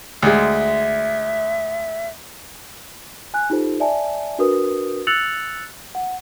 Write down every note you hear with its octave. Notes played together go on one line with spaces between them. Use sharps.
D2 G#3 E5
G#5 F#6
D#4 F4 G4 A4 C5
D5 E5 G#5 A5
D4 F#4 A#4 B4 D#6
E6 F#6 A6 C#7 F7 F#7
F#5